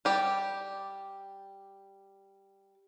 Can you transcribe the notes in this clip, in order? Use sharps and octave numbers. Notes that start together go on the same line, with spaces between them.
G3 G4 D5